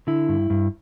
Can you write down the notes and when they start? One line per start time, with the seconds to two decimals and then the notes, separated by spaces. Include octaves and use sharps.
0.07 D3 E4
0.29 G2
0.50 G2